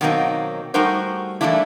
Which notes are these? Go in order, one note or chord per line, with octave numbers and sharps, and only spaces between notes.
B2 D#3 F#3 A#3 C4 D#4
G3 A3 D#4 F#4 A#4 C5
E3 G3 A3 A#3 D4 E4